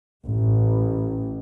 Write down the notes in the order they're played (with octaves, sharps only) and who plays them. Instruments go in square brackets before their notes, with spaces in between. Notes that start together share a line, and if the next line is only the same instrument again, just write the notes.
[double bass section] A1